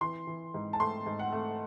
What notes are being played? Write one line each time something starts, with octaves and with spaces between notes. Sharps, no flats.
E3 C6
E3
G#2
A5
A3 C6
G#2
F#5
A3